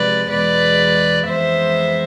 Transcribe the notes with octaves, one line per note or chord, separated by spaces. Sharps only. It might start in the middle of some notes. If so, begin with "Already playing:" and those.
Already playing: C3 F3 G#3 B4 D5
E2 B2 G#3 B4 D5
F2 E3 G#3 B3 C5 E5